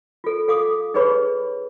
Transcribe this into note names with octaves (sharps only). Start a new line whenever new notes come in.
F4 A4
A4 F5 D6 D#6
D#4 G#4 B4 C#5 B5 C#6